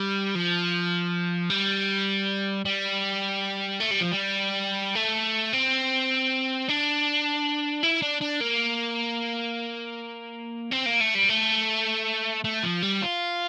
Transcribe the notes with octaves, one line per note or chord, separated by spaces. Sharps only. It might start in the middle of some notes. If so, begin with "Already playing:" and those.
Already playing: G3
F3
G3
G3
A3
G3
F3
G3
A3
C4
D4
E4
D4
D4
A#3
C4
A#3
A3
G3
A3
A3
F3
G3
F4